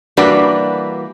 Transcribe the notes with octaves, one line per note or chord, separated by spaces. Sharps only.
E3 G3 A#3 D4 F#4 B4